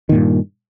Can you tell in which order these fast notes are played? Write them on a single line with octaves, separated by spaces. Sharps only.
D#3 A#2 G2